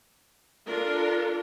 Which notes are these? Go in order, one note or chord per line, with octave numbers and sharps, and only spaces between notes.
D4 F4 A4 A#4